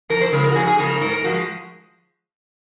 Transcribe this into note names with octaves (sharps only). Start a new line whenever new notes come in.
F2 A#4
C5
C#3 F3 G#3 A#4
A#4
F#4
F2 G#4
G#4
C#3 F3 G#3 A#4
A#4
G#2 A#4
A#4
F3 G#3 F#4